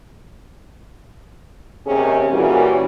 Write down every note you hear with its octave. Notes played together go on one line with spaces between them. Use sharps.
D#2 C3 C#4 G#4
A#2 E3 G3 C#4 F#4